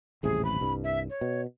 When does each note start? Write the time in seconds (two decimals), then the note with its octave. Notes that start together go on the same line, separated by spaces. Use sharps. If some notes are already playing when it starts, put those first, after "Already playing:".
0.23 D#1 A1 C3 G#4
0.45 B5
0.61 C2 G2
0.84 E5
1.10 C#5
1.21 B2